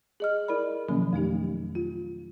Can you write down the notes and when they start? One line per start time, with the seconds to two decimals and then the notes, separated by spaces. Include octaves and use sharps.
0.20 G#4 D#5 F6
0.48 E4 A#4 D5 B5
0.89 B2 D#3 F3 F#3 A#3 C#4
1.13 F2 A3 D#4 G4
1.75 F4